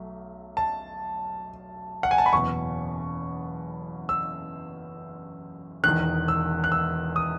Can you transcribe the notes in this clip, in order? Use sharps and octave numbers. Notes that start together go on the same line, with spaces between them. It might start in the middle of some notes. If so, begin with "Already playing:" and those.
Already playing: B1 F#3 A3
A5
F#5
G#5
A5
B5
F#1 E2 B2 C#6
E6
E1 E2 D#3 F#6
E6
F#6
E6
D#6